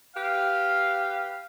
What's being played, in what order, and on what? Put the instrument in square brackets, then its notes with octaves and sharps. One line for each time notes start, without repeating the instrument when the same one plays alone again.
[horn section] G4 B4 F5